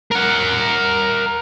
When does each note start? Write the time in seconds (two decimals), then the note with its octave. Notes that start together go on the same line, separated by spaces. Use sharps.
0.11 A#4 F#5